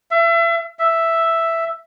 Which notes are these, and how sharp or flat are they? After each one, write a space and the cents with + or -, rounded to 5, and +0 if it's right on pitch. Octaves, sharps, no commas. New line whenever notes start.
E5 +35
E5 +5